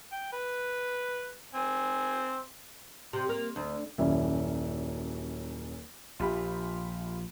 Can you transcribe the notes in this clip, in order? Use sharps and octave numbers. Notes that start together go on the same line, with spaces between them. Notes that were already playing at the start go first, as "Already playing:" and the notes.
G5
B4
C4 G#5
C3
A#3
D2
D#1 F#2 C#4 E4 D5 E5
A#1 F4 G4 B5